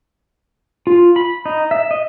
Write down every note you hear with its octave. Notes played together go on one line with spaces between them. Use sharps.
F4
B5
D#4
E5
D#5